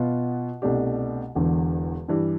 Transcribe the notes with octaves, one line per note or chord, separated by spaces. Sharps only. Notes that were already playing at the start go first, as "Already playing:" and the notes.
Already playing: B2 B3 F4
C2 B2 A3 D4 G4
E1 E2 D3
G2 E3 G3